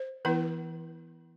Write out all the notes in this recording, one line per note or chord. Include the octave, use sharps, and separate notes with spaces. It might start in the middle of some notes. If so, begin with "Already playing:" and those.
Already playing: C5
E3 B3 E4 B4